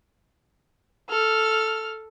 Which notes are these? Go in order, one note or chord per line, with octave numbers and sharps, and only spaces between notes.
A4 F6